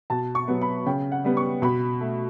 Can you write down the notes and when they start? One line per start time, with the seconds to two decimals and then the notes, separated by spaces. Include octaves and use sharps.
0.10 B2 A5
0.35 C#6
0.48 F#3 B3
0.61 B5
0.86 C#3 G5
1.12 F#5
1.24 G3 B3
1.37 C#6
1.62 B2 B5
2.00 A3